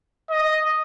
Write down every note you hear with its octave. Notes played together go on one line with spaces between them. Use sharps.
D#5